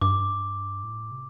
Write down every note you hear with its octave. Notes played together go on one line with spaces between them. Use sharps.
G2 D6
A2
C3